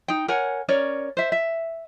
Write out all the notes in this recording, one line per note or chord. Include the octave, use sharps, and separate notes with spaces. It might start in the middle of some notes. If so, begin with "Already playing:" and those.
D#4 G5
A#4 C#5 F#5 G#5
C#4 A#4 C#5 D5
C5 E5
E5